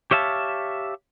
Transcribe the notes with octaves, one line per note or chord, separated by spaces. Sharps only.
G4 C#5 E5 F5 A5